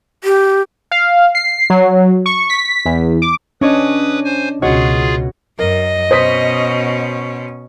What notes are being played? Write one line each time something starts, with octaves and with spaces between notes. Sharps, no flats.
G4
F5
C7
F#3
C#6
B6
E2
D6
C#4 D4 B4 C#5 D#5 D#6
C5 G#5
C#2 B2 F4 F#4 G#4 C#5 D#5
F#2 A#4 D#5
B2 C#4 C5 D#6 B6